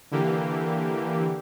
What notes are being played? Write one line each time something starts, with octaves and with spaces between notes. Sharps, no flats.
D3 E3 A#3 G4